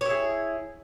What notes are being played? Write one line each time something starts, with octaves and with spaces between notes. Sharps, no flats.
E4 G#4 C#5